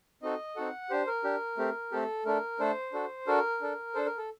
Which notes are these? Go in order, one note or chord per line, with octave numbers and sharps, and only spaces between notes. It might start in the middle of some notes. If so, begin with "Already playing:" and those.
C4 D#4 F#4 A4 D#5
C4 D#4 F#4 A4 F#5
D4 G4 C5
A#4
D4 G4
A3 C4 G4
A3 C4 G4 A4
A3 D4 A4 A#4
A3 D4 A4 C5
D4 F#4 A4
D4 F#4 A4 A#4
D4 A4
D4 A4 C5
A#4
A4